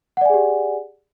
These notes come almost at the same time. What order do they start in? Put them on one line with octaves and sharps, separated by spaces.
F#5 D5 G#5 G#4 G4